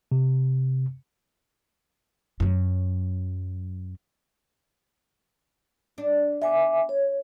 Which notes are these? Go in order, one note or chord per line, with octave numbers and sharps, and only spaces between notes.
C3
F#2 F#3
D4
B3 E5 G#5 D6
C#5